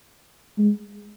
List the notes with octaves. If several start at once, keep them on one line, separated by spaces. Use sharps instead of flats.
G#3